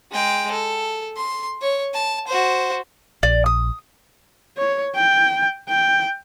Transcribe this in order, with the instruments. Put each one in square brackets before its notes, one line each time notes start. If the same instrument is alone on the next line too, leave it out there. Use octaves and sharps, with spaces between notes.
[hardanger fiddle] G#3 G5
A4
C6
C#5
A5
F#4 C5
[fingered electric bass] A#1 [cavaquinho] D5
[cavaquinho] D#6
[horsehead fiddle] C#5
G5
G5